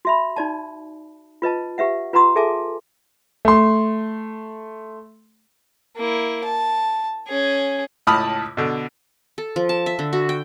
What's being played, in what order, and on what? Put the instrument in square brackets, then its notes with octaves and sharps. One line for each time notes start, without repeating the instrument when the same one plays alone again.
[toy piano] F#4 E5 B5
D#4 D5 A5
F4 B4 D#5 A5
G4 B4 E5 F#5
F4 B4 F#5 A#5 C6 D#6
G#4 A4 E5 G#5 A5 D6
[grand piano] A3 C6
[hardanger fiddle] A#3 E4
A5
C#4 G#4
[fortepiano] C#2 A2 A5 B5 D#6 F6
B2 D3
[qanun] A4
F3
A5
E5
D3
F#4
G5